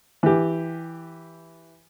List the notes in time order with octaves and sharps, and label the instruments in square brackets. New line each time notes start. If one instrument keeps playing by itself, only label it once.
[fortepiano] E3 G4